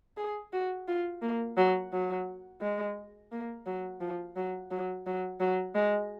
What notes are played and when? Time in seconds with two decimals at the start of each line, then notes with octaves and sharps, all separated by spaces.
0.17 G#4
0.53 F#4
0.88 F4
1.22 A#3
1.57 F#3
1.92 F#3
2.61 G#3
3.32 A#3
3.66 F#3
4.01 F3
4.36 F#3
4.71 F#3
5.06 F#3
5.40 F#3
5.75 G#3